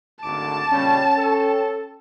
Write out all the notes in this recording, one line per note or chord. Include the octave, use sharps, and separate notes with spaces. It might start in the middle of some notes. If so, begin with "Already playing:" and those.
G#1 D2 A5 D6
A#2 C#3 G3 C#4 G5
A4